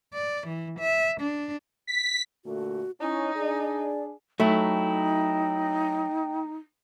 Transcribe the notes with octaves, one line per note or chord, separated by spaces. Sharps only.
D5
E3
E5
D4
B6
A#2 D3 A3 F#4
C#4 D#4 E4
D4 G#4 D5
F#3 A3 D#4 E4 G5